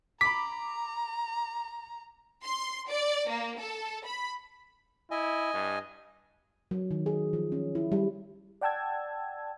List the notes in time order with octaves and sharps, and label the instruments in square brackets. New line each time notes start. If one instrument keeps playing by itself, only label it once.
[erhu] A#5 [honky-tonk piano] B5 D6 [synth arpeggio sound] B6
[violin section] C6
D5
A#3
A4
B5
[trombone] E4 [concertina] D#5 G#5
[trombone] G2
[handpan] F#3
D#3
G#4
F3
C#4
E4
G3
[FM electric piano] D5 F#5 G5 A5 E6 G#6